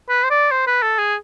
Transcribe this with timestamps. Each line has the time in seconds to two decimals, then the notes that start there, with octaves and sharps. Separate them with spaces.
0.09 B4
0.24 C5
0.30 D5
0.51 C5
0.67 B4
0.82 A4
0.98 G#4